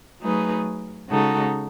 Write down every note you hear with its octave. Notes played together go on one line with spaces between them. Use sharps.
F#3 A3 D#4 G#4 B4
C#3 G#3 D#4 F#4 A4